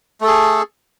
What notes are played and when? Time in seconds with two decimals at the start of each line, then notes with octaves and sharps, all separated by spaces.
0.21 A3
0.24 A4
0.27 G#4